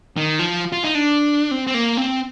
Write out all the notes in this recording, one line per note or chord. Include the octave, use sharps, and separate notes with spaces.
D#3
F3
F4
D#4
D4
C4
C4
A#3
C4